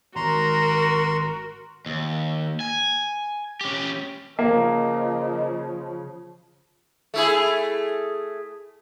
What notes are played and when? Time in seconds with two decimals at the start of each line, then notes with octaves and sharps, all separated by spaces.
0.16 G#1 F#4 A#4 A#5 C6
1.86 D#2
2.60 G#5
3.61 C#4 G4
4.39 C#3 F3 A#3 D#5
7.14 A3 E4 G#4